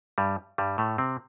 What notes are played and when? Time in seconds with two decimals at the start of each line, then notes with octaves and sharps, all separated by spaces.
0.18 G2 G3
0.58 G2 G3
0.78 A2 A3
0.98 C3 C4